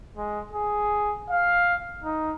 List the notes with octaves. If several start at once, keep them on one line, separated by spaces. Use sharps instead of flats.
G#3
G#4
F5
D#4